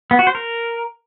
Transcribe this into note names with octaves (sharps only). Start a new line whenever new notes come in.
B3
F#4
C5
A#4